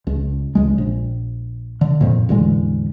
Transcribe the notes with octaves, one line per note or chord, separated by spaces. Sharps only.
C#2
C#2 G#3
A#1
D3
F2 A#2
A1 E2 D3 G#3